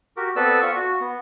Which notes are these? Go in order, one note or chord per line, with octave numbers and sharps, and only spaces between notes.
F#4 G4 A#4
B3 C4 A4 B4 D5 E6
F4 C#6
F#4
B3